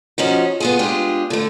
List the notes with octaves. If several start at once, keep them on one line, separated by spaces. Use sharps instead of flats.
F3 C#4 D#4 F#4
B3 F4 G#4
G#3 D4 F4 G4 G#4
D3 A3